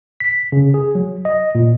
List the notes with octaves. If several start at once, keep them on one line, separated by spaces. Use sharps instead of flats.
B6
C#3
G#4
F#3
D#5
A#2